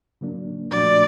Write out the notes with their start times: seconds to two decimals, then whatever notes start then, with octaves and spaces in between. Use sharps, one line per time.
0.21 C#3 F#3 A#3 D4
0.71 A#2 F3 A3 D4 F#4 D5